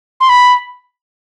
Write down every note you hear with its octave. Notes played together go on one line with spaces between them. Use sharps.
C6
B5